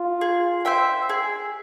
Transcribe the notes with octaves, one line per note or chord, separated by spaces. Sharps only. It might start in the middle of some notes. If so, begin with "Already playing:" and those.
Already playing: F4
G#4
C5 E5 G5
G#4